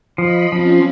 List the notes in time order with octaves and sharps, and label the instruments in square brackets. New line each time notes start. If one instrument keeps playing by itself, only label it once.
[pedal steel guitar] F3 [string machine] D#5 B5
[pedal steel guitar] F3 [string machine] C4 C#4 F4